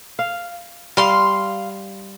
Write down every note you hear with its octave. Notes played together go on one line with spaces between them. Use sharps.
F5
G3 F5 C6